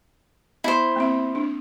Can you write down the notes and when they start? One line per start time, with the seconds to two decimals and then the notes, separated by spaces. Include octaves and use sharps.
0.64 B3 E4 C5
0.96 A#3 C4 E5
1.35 D4